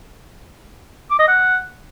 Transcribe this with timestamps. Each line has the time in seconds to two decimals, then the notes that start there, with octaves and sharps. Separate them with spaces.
1.11 D6
1.20 D#5
1.28 F#5